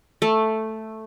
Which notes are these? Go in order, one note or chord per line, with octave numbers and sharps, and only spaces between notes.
A3